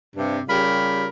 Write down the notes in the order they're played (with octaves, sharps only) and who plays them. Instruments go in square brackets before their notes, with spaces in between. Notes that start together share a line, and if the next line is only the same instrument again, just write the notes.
[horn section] G2 C3
C#3 G3 F4 G4 A#4 B5